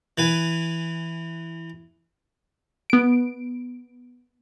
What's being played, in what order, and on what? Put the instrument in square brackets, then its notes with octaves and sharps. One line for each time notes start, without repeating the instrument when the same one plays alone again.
[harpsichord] E3 B4 G#5
[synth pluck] B3 D7